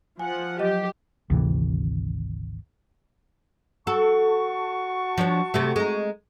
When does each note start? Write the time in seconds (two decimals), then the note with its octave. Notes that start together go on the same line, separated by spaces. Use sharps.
0.19 F3 F#5 G#5
0.59 F#3 G4 D#5
1.30 G#1 D2 C3 E3
3.87 F#4 A4 A5 C#6
5.18 F3 D4 C#5
5.54 C3 G3 A3
5.76 G#3 D#4